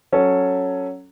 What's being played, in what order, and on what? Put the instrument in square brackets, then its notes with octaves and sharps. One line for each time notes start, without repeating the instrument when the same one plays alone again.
[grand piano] F#3 C#4 A4 C#5